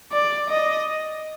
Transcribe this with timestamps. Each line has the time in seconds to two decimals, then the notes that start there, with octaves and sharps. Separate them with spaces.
0.13 D5
0.50 D#5